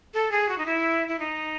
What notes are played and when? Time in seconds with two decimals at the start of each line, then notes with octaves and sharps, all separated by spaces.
0.14 A4
0.31 G#4
0.49 F#4
0.58 D#4
0.66 E4
1.08 E4
1.19 D#4